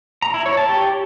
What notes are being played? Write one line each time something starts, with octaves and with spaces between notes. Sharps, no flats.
A#5
E4
C#5
A5
G4